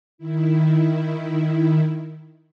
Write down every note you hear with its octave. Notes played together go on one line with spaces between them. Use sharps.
D#3 E4